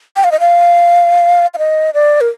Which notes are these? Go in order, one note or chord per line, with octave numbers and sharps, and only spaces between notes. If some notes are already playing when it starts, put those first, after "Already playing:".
G5
F5
D#5
F5
F5
D#5
D5
A#4